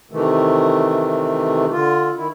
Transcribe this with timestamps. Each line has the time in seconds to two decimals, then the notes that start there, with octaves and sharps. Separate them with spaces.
0.11 C3 D#3 E3 A3
1.72 D3 F4
2.17 D#3 E4